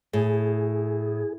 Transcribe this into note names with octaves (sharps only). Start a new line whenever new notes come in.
A2 G#4